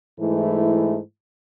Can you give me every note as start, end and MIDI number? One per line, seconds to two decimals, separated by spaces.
0.20 0.98 44
0.20 0.98 52
0.20 0.98 57
0.20 0.98 64